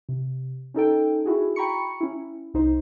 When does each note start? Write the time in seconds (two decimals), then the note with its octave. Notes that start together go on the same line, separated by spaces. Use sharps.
0.09 C3
0.74 C#4 D#4 A4 G5
1.26 E4 F#4 G#4
1.56 G5 A#5 B5 C#6 C#7
2.01 C#4 E4
2.54 C2 D#4 C5